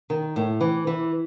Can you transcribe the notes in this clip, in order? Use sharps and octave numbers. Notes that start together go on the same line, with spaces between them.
D#3
A2
E3
E3